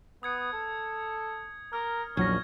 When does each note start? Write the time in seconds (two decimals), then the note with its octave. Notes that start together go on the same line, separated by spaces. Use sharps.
0.23 B3 D#6 G#6 C#7
0.53 A4
1.73 A#4 F6
2.17 A#1 E2 F#3 C#4 G#6 A#6